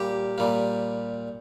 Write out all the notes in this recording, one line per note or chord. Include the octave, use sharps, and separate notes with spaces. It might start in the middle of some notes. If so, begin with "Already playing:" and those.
Already playing: A#2 G3 A#3 G4
A#2 G3 A#3